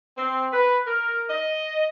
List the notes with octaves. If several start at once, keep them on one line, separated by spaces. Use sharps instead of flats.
C4
B4
A#4
D#5